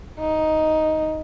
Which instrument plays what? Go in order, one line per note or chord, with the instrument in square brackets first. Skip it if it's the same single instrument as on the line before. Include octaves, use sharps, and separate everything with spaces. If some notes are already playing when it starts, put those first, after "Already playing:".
[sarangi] D#4